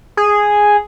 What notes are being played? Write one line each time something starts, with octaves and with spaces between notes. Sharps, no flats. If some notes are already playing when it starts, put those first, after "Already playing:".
G#4